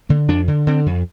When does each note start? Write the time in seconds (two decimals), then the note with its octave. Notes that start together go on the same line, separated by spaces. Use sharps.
0.09 D3 A#3
0.28 F2 D4
0.48 D3
0.67 D3 C4
0.86 F2